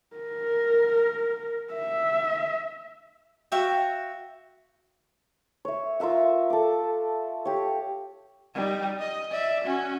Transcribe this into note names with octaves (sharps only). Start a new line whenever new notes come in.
A#4
E5
F#4 E5 F5 G5
C#5 E5
F4 A#4 E5 F#5
A4 D6
G4 C#5
G3 D#4
D#5
D5 E5
C#4 F#4